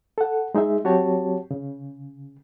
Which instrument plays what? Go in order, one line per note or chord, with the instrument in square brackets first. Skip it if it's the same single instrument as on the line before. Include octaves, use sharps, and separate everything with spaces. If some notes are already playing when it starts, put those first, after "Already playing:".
[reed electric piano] A4 F#5
G#3 D#4 G#4 E5
F#3 C4 F#4 G4 C#5 A5
C#3